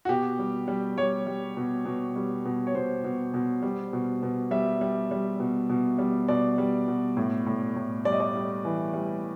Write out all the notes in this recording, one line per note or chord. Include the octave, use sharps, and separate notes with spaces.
F#4
B2 G4
G3
G3
G3 C#5
G3
B2
B2
G3
B2
C#5
B2 C5
B2
B2
G3
B2
B2
G3 E5
G3
G3
B2
B2
G3
B2 D5
G3
B2
A2
A2
A2
G3 D5
D#5
D5
G3
E3
G3